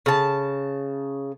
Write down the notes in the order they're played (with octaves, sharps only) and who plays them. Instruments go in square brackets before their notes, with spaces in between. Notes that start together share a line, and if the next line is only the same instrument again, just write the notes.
[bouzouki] C#3 A5